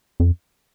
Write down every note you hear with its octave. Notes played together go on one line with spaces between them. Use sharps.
F2